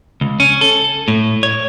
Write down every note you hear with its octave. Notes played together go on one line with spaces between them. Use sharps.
C#2
C#4
A4
A2
C#5